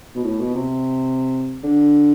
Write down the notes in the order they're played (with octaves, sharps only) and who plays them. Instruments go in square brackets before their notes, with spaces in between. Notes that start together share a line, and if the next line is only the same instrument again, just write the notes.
[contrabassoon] B2
A2
B2
C3
D3